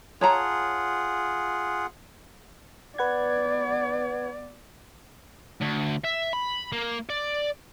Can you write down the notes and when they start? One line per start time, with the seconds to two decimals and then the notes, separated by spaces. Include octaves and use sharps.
0.21 F4 G#4 C#5 F#5 A5 A#5
2.98 B3 B4 D5 F#5 G#6
5.61 D2
6.04 E5
6.33 B5
6.73 A#3
7.09 D5